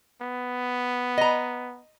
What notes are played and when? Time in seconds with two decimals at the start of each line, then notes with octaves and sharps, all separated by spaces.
0.21 B3
1.18 D#5 A#5